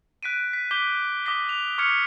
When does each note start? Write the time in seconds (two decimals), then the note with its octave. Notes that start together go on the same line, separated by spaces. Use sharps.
0.23 F#6 B6 D7 D#7
0.53 B6
0.71 D6 G6 B6 G7
1.26 D6 D#6 A#6 B6 G7
1.49 F7
1.78 C#6 D6 F6 G#6 C#7 F7